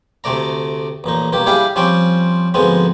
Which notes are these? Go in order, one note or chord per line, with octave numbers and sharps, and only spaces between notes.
D2 C3 A3 D5 A#5
A1 A#2 D#4
B1 G2 A#3 G4
G3 D4 E4 G4 G#4 F5
F3 G3 C4 C#4 C5 D5
D2 G#2 F3 G#3 B3 C4